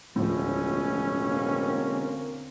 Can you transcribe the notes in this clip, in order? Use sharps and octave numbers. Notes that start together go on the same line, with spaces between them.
E1 D2 A2 F3 C#4
D3 A#3 C4